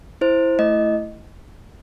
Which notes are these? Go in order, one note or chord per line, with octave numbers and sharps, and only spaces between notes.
E4 C5
A3 D#5